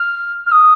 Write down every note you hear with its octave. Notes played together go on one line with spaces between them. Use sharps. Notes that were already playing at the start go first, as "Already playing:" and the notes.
Already playing: F6
F6
D#6